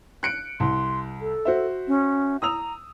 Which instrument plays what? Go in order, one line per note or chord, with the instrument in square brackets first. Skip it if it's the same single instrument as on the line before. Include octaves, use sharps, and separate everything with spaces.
[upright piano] F#6 C#7 D7
[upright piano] C2 [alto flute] C6
[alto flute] A4
[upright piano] F#4 C5 E5
[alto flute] C#4
[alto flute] A#5 [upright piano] D#6 E6 F7